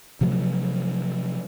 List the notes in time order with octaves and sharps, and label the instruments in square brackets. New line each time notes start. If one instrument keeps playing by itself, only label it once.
[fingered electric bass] C3 F3 F#3 A3